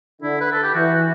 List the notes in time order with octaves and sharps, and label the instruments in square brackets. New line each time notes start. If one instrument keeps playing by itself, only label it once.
[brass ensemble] D3 [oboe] E4
[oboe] B4
A4
G4
[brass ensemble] E3 [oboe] F#4
[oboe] F#4